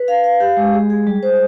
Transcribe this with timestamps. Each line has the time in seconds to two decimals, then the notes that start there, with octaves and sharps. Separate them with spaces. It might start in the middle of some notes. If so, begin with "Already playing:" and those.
Already playing: B4
0.08 F5
0.24 F5
0.40 G4
0.57 G#3
0.73 G#4
0.90 G#4
1.07 G3
1.23 C5